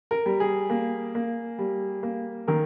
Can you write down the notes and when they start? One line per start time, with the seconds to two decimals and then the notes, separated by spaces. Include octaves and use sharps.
0.11 A#4
0.26 G3
0.40 G#4
0.70 A#3
1.15 A#3
1.58 G3
2.03 A#3
2.48 D#3 A#4